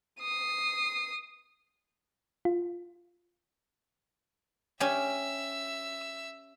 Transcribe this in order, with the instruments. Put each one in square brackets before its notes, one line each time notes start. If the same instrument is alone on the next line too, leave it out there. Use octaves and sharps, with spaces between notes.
[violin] D#6 C7
[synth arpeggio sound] F4
[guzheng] C#4 G4 [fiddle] E5 E6